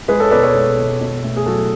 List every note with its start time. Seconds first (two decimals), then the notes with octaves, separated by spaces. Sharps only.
0.08 G#3 G#4 B4
0.20 A4 C#5
0.31 B2 B4 D5
0.43 A4 C#5
0.55 G#3
0.78 B2
1.01 B2
1.24 A3
1.37 G#4
1.46 F#3 F#4 A4